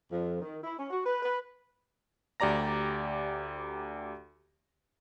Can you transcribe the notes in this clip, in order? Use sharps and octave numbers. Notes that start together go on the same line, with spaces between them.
F2
D#3
E4
C#4
F#4
B4
B4
D2 G4 D5 A#5 A#6